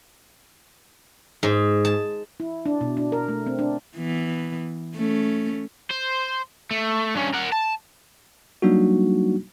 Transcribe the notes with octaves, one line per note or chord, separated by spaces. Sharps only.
G#2
A5
E4
D4
B2
D4
A#4
A3
C4
D4
E3 B3
A3 C#4
C5
A3
G2 C#4
A#4 F#5
A5
F#3 G3 A#3 D4 D#4 F#4